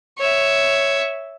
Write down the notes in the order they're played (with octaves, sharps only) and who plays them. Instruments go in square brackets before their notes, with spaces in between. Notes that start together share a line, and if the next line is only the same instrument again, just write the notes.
[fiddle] C#5 E5